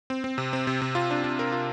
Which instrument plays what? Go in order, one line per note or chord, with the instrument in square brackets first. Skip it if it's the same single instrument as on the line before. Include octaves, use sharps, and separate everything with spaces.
[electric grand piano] C4
C4
C3
C4
C3
C3
F4
D4
D4
A#4
F4